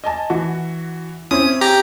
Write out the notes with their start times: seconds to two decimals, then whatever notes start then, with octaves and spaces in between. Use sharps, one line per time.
0.04 D#5 G#5 A5
0.30 E3 F#4
1.31 C4 C#4 E4 D#6
1.61 G4 A#5